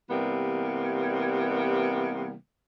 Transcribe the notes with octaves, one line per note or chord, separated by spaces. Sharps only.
C3 E3 G3 A#3 B3